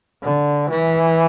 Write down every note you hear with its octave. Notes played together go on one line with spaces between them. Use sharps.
D3
E3